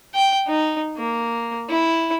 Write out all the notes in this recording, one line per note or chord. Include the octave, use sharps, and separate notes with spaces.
G5
D#4
A#3
E4